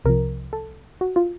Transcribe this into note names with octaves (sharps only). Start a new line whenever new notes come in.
C2 C3 F3 A#4
A4
F#4
F4